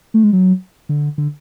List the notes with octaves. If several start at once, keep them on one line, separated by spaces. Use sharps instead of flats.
A3
G#3
F#3
D3
D3